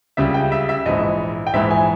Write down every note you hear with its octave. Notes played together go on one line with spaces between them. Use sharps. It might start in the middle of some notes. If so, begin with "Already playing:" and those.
C#2 C#3 G3 E5
G5
E5
E5
A#1 G#2 E3 D#5
G5
A#1 G#2 E3 E5
G#5